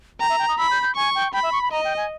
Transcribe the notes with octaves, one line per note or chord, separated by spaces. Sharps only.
G5 A#5
E5
G5
D#6
B5 E6
G6
G6
G#5 C#6
G5
G5 B5
E5
C#6
B5
D#5 A#5
G5
G#5